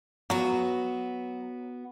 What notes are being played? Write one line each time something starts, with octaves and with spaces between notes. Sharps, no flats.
F#3 B3 F#4